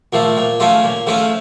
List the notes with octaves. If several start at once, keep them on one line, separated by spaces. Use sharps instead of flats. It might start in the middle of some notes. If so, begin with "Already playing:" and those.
A#2 F3 A3
A#2
F3 A3 C#4 F4
A#2
F3 A3 C#4 F4